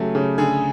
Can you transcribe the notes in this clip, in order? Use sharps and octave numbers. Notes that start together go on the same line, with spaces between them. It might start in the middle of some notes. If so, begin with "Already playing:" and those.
Already playing: C#3 F#3 A3 G4
C#3
D3 G#4